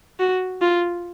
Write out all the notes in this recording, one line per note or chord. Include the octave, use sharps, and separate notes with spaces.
F#4
F4